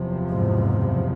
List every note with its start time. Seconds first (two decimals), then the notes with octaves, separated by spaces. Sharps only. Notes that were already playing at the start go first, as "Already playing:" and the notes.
Already playing: F#1 E2 C3 F3
0.30 G#2